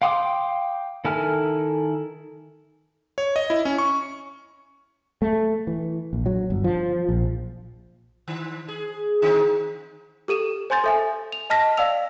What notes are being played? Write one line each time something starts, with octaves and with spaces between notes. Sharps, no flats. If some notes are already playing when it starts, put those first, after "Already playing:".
F5 G5 C6 D6 D#6
D#3 E4 A4 G#5 F6
C#5
D#5
E4
C#4
C#6
A3
E3
A#1
F#3
G1
F3
A#1
D#3
G#4
D#3 C4 D#4
G4 A4 D#7 E7
C5 G#5 C6 G6 A6
A4 E5 G#5
F7
D#5 A5 F6 A#6 B6
D5 F5 G5 E6 F7